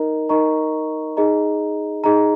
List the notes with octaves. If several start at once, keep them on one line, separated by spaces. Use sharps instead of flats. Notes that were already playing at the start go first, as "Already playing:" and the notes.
Already playing: D#4 A#4 D#5 A#5
D#4 A#4 D#5 A#5 C#6
D#4 G#4 D#5 A#5
D#4 G#4 D#5 A#5